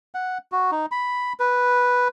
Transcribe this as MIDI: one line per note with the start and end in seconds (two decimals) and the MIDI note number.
0.15 0.38 78
0.52 0.71 66
0.71 0.86 63
0.91 1.33 83
1.39 2.08 71